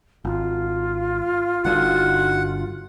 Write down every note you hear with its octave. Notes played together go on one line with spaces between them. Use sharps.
G#1 F4
G1 G2 D3 D#4 F#4 F#5